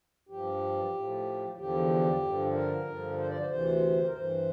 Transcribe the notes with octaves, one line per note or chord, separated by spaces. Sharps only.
G2 F3 G4
A2 F3
E2 D3 F3 G4
G2 D3 F3
A#4
G2 D3 F3
C5
D5
C5
D2 C3 E3 C5
A#4
G2 E3 C5